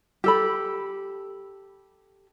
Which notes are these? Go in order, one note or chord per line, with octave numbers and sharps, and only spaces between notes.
G4 A4 B5